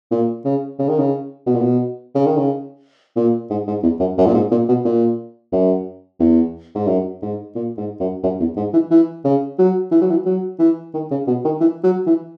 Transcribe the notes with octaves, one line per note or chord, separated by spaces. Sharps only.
A#2
C#3
C#3
D#3
C#3
B2
A#2
B2
C#3
D#3
C#3
A#2
G#2
G#2
E2
F#2
F#2
A#2
G#2
A#2
B2
A#2
F#2
E2
G#2
F#2
G#2
A#2
G#2
F#2
F#2
E2
G#2
E3
E3
C#3
F#3
E3
F#3
E3
F#3
E3
D#3
C#3
B2
D#3
E3
F#3
E3